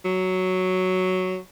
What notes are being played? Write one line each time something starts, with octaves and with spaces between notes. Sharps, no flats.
F#3